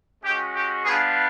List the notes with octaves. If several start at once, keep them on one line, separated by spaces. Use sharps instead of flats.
G#3 C#4 F#4 G4
G4
G3 B3 D4 F4 G#4